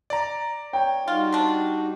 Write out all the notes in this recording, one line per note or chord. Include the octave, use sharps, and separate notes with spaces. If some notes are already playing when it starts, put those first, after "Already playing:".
D5 A#5
C#5 G5
G3 D#4 F4 F#4
C4 D4